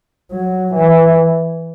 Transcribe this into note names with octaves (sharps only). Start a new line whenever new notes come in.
F#3
E3